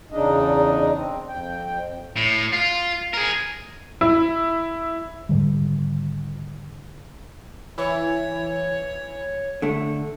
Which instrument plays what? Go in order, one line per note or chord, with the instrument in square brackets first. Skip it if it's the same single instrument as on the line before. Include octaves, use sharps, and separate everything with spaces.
[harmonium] E2 C#3 D4 D#4 D#5
C4
F2 G5
[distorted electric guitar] A2
F4
G#4 A#4
[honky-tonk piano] E4
[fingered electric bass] G#2 D3 D#3 G3
[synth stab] E3 E4 [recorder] C#5
[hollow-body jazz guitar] D3 A3